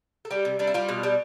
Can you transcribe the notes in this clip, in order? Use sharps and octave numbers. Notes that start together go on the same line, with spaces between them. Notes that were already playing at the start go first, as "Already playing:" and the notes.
A4
G3 G4
C3
G3 D4
E4
G3 F4
B2
G3